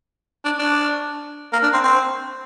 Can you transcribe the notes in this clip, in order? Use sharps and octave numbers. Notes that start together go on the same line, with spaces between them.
D4
D4
A#3
D4
C4
C4